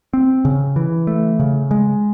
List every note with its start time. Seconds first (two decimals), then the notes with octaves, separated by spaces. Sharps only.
0.13 C4
0.45 C#3
0.76 E3
1.07 A3
1.40 C#3
1.71 G#3